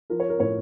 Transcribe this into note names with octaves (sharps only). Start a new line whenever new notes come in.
F3 A#4
C#5
A#4
A2 C#5